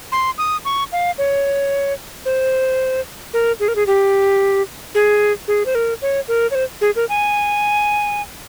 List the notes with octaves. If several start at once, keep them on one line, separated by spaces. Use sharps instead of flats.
C6
D#6
C#6
F5
C#5
C5
A#4
G#4
A#4
G#4
G4
G#4
G#4
C5
A#4
C#5
A#4
C#5
C5
G#4
A#4
G#5